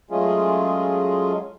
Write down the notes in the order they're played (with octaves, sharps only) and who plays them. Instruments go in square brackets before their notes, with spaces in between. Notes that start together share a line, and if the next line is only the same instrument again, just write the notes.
[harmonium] F#3 G#3 A3 C#4 F4 G#4